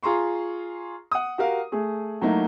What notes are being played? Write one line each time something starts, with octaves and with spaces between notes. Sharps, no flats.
F4 G#4 A#5 C6 C#6
F#5 D#6
F#4 G4 A#4 F5
A3 G#4
F#3 A3 A#3 D#4 E4 F#4